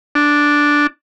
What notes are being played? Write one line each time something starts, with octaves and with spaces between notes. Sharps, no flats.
D4